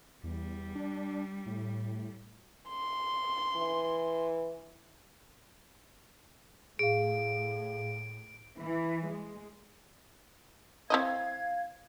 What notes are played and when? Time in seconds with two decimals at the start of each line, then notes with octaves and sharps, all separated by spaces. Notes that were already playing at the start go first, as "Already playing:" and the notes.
0.24 E2 G3
0.75 D4
1.46 A2
2.69 C6
3.56 E3
6.79 A2 G#4 F5 D7
8.59 E3
9.09 G#3
10.90 C4 E4 D#5 F5 G#6